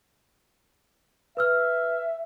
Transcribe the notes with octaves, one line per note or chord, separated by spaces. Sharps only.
B4 E5 E6 F6